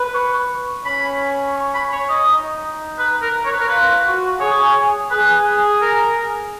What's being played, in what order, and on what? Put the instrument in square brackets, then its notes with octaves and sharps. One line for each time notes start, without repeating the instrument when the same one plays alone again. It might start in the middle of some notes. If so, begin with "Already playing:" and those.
Already playing: [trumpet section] B4
[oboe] C#6
[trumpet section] C#4 [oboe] B5
[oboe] C#6
B5
C#5
D#5
[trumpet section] D#4
[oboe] B4
A#4
C#5
B4
A#4
[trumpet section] F4 [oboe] B4
[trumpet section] F#4
[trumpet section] G#4 [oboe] C#5
[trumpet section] G#4 [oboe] B4
[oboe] A#4